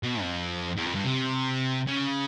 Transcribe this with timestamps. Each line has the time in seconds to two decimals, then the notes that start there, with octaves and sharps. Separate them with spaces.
0.03 B2
0.22 F2
0.77 E2
0.86 F2
0.95 G2
1.04 C3
1.87 C#3